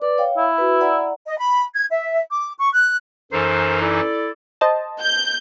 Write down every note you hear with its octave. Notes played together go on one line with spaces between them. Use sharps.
B4 D5
C#5 F5 G5
E4
F#4 B4
D5 F#5 A#5
D#5
B5
G#6
E5
D6
C#6
F#6
F#2 E3 D#4 A4 A#4 C5
E4 A4 D5
C5 D#5 A5
G6